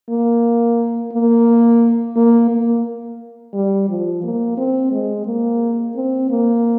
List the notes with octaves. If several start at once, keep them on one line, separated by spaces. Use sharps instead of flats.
A#3
A#3
A#3
A#3
G3
F3
A#3
C4
G#3
A#3
C4
A#3